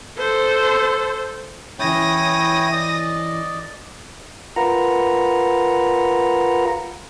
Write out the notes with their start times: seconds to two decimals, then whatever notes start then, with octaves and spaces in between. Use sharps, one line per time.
0.18 A4 C5
1.79 E3 C#4 E4 C#5 G5 D#6 A#6
2.72 D5 D#5
4.56 F4 A#4 B4 F#5 A#5